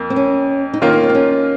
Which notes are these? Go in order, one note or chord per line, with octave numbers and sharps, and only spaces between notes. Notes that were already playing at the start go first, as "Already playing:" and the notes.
Already playing: F2 A#3
C4
C#4
D#4
D#3 A#3 C#4 F4
D#4
C#4
C4
C#4